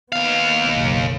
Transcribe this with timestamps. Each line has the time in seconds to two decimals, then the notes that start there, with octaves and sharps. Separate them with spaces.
0.12 D#2 B3 F5
0.71 F#1 B1